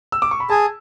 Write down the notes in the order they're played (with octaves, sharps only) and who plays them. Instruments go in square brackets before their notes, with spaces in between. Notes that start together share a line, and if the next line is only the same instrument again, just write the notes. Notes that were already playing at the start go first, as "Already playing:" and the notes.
[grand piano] E6
D6
C#6
B5
[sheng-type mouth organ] G#4 [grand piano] A5